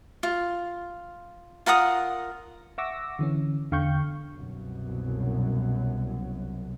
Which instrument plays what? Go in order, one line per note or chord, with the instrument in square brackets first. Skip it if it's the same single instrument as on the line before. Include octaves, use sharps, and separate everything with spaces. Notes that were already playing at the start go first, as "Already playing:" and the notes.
[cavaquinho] F4
F4 A#4 F#5 D#6
[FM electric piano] E5 F#5 C#6 D6 E6 A#6
D3 E3 C#4
E2 D3 F5 G5 C#6 G6
[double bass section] C2 F#2 B2 F#3